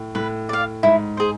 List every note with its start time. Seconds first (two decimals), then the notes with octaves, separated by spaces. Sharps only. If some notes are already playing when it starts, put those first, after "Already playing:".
Already playing: A2
0.15 A2 B4
0.49 D5 F5
0.83 G#2 E4
1.17 G#4 C5